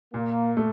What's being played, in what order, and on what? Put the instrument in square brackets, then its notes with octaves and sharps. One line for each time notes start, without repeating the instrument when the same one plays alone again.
[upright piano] A#2 [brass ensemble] A#3
[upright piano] A3